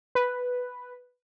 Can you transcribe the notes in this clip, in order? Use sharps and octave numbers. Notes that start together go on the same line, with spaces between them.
B4